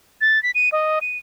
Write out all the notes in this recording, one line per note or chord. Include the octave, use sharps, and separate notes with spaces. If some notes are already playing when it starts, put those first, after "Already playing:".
A6
B6
D#7
D#5
D#7